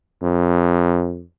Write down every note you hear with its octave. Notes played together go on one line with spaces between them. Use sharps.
F2